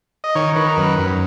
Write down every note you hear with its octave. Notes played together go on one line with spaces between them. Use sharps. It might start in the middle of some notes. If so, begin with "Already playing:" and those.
D#5
D#3 C#5
D#3 B4
A#4
F#2 B4
F#2